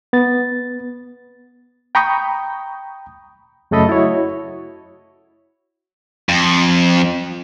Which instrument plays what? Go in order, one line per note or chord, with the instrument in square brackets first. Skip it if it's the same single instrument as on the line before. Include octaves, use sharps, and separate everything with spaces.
[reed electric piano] B3 A6
G5 A#5 B5 C#6 D#6 G6
F#2 C#3 A3 A4 D#5 B5
E4 F#4 C#5
[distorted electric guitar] F2